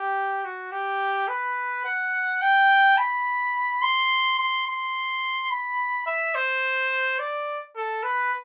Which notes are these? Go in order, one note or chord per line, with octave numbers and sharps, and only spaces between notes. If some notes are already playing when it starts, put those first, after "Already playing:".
Already playing: G4
F#4
G4
B4
F#5
G5
B5
C6
C6
C6
B5
E5
C5
D5
A4
B4